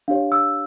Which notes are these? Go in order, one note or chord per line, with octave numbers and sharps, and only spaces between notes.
D4 G4 C#5 F5
E6